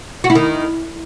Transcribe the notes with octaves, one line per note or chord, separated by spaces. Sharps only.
F#4
E4
D#3